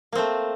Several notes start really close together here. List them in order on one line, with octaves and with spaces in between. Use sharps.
A#3 C4 A3